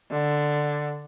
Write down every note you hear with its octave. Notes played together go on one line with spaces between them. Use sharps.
D3